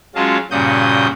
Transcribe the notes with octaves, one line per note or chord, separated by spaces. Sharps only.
F#3 G#3 C#4 F4 A5
G2 A#2 C#3 F#4 D#6 G6